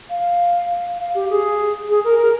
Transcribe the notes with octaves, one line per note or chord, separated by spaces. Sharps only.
F5
F5
G4
G#4
G#4
A#4
A#4